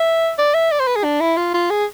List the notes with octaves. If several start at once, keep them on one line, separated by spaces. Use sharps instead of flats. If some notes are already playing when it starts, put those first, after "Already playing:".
Already playing: E5
D5
E5
D5
C5
B4
G#4
D4
E4
F4
F4
G#4